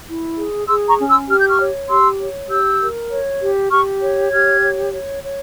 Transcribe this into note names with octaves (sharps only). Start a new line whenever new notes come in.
E4
G#4
G#4 C6 E6
A#5 C#6
C#4
C6 E6
G4 F6
G6
C#6 F6
C#5
G4 C6 E6
C#5
G4 E6 G6
A#4
C#5
G4
G4 C#6 F6
C#5
G4 F6 G#6
C#5
C#5
C#5